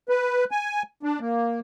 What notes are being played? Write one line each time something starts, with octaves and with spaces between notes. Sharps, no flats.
B4
G#5
D4
A#3